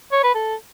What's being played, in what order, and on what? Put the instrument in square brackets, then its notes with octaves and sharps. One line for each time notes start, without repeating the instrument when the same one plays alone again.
[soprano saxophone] C#5
B4
A4